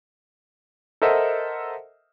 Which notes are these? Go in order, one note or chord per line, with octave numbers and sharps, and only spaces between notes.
A4 A#4 C5 D#5 E5 F#5